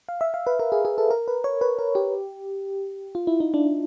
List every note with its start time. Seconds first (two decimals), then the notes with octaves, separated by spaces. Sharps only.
0.09 F5
0.21 E5
0.34 F5
0.47 B4
0.60 A#4
0.72 G#4
0.85 G#4
0.98 A4
1.11 A#4
1.28 B4
1.44 C#5
1.61 B4
1.79 A#4
1.95 G4
3.15 F4
3.27 E4
3.40 D#4
3.54 D4